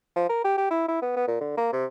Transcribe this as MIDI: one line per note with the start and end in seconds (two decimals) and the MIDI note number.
0.16 0.28 53
0.29 0.44 70
0.45 0.56 67
0.58 0.70 67
0.71 0.85 64
0.89 1.01 64
1.02 1.14 59
1.16 1.25 59
1.28 1.37 46
1.41 1.54 50
1.57 1.70 58
1.73 1.85 48